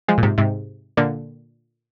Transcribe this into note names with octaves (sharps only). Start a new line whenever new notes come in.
F3 G#3
A#2
G#2 C3
G#2 C3
A#2 D3